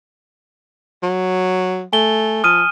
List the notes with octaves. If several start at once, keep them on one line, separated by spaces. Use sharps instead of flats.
F#3
A3 G#5 G7
F3 D#6 F6 D#7